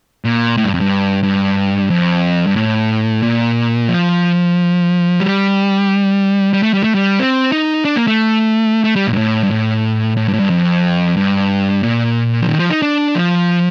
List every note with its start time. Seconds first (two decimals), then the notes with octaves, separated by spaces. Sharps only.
0.25 A#2
0.57 A2
0.65 G2
0.74 F2
0.81 G2
1.23 G2
1.90 F2
2.47 G2
2.56 A2
3.23 A#2
3.88 F3
5.20 G3
6.53 G3
6.63 A3
6.74 G3
6.84 A3
6.95 G3
7.20 C4
7.52 D#4
7.85 D4
7.96 A#3
8.07 A3
8.84 A3
8.96 G3
9.07 A#2
9.13 G2
9.17 A2
9.43 G2
9.51 A2
10.17 A2
10.28 G2
10.33 A2
10.39 G2
10.50 F2
11.17 G2
11.83 A#2
12.42 F3
12.48 D#3
12.59 F3
12.70 D#4
12.82 D4
13.15 F3